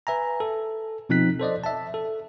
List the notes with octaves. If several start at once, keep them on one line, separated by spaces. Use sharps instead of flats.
B4 E5 G#5 A#5
A4
B2 F3 C4 D#4 F#6 B6
A4 C5 D5 D#5
E5 A5
A4